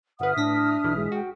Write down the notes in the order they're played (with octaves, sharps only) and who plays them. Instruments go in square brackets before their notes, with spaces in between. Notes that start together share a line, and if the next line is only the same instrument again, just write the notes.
[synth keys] G1 B4 [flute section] E5 D#6 F6 [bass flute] F#5
[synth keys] A2 A#6 B6 [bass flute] D4
[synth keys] B1 E3
[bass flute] G#3
[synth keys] F#4 [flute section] G5